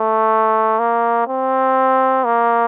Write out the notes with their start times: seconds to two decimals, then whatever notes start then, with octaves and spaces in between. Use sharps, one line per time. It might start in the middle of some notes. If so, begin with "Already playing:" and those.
Already playing: A3
0.79 A#3
1.28 C4
2.25 A#3